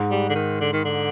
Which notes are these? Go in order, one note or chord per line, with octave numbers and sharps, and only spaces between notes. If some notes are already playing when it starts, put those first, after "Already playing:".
Already playing: G#2
G3
D3
D#3
D3
D#3
D3